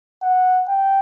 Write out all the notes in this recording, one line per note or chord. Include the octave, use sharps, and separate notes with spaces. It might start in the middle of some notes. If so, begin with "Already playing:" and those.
F#5
G5